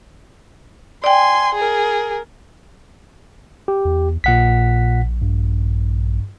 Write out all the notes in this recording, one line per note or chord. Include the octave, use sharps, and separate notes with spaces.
D5 G5 G#5 C6
G#4 A#4
G4
E2
A#1 A#2 F#5 B6
G2